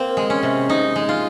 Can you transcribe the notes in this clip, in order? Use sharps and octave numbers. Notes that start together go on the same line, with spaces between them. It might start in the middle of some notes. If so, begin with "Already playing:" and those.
Already playing: A#3 C4
G#3
C#4
C3
C3 D#4
G#3
F4